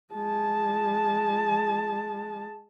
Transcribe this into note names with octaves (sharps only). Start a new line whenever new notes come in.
G#3 A5